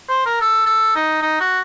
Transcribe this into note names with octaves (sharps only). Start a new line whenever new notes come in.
C5
A#4
A4
A4
D#4
D#4
F#4